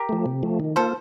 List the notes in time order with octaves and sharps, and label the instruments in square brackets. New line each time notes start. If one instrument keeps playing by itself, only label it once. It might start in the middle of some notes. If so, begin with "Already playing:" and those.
Already playing: [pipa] G4 A#4
[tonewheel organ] F3 A3
C3
F3 A3
D#3
[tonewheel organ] A#3 F4 [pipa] A4 C5